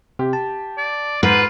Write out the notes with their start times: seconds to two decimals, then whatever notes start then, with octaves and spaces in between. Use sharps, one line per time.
0.19 C3 G4
0.33 A5
0.78 D5
1.23 G#2 F4 B4 F#5